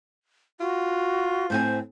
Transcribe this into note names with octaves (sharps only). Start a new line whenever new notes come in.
F4 F#4
A2 C4 C5 G#5